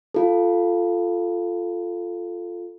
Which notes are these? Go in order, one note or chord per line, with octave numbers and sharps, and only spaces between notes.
F4 A4